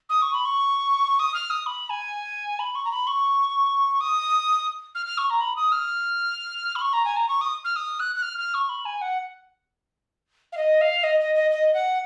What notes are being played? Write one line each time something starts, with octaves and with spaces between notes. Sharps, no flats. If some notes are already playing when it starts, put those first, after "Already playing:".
D#6
C#6
B5
C#6
D#6
F6
D#6
B5
G#5
B5
C#6
A#5
B5
C#6
D#6
F6
F6
C#6
A#5
B5
D#6
F6
B5
C#6
A#5
G#5
A#5
C#6
D#6
F6
D#6
F#6
F#6
F6
F6
C#6
B5
G#5
F#5
F5
D#5
F5
D#5
D#5
D#5
D#5
F#5